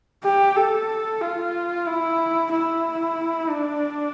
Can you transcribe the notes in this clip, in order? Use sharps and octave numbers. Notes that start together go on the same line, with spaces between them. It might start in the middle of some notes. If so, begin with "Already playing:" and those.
G4
A4
F4
E4
E4
D4